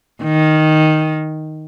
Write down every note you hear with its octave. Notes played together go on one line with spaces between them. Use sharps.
D#3